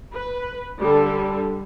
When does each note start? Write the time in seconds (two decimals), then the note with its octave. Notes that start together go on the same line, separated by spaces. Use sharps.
0.12 B4
0.81 D3 G3 A4